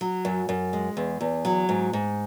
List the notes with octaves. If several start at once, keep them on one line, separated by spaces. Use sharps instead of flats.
F#3
F#2
F#2
G#3
E2
E2
F#3
G#2
G#2